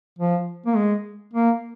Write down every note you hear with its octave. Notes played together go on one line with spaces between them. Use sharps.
F3
A#3
G#3
A#3